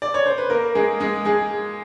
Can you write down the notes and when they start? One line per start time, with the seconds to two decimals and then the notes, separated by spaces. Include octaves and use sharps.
0.02 D5
0.14 C#5
0.26 C5
0.38 B4
0.50 A#3 A#4
0.75 G#3 G#4
1.00 G#3 G#4
1.25 G#3 G#4